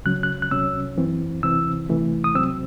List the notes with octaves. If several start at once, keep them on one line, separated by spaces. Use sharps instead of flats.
C#2 C#3 F#3 C#4 F#6
F#6
F#6
C2 C3 F#3 C#4 E6
F#2 E3 C4
C3 E3 C4 E6
C2 C3 E3 A3
D#6
C#2 C3 F#3 C4 E6